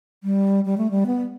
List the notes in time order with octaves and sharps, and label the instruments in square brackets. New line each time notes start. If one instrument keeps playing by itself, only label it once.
[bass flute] G3
G3
A3
G3
B3